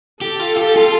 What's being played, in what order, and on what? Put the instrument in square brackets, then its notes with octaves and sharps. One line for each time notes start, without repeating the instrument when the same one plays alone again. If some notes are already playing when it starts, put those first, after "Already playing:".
[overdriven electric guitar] G4 [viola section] A4
[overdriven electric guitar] F4
G4
F4